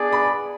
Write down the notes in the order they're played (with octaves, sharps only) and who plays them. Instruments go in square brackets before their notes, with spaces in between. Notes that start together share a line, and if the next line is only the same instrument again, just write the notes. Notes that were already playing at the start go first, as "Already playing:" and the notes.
Already playing: [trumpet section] B3 D4 G#4 D5
[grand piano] B5